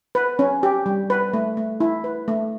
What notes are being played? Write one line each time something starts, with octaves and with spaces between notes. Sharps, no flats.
B4
C#4
G4
G3
B4
A3
A3
E4
B4
A3